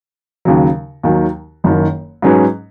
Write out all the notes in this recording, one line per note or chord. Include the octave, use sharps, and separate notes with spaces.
D#2 C#3 F#3
D#2 D#3 F#3
F#1 F#2 D#3
G#2 F#3 C#4 G#4 B4